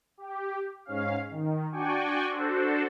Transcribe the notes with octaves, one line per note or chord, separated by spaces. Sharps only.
G4
G#2 C#4 F5
D#3
D4 F#4 D5 G5 G#5 C#6
D4 F#4 A4 C5